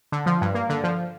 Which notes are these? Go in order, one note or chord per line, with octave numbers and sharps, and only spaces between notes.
D3
F3
G2
A#3
D3
F3